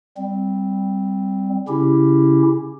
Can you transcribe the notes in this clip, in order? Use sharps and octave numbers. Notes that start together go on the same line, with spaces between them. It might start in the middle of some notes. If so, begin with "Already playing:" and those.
G3 C4
C#3 C#4 E4 G4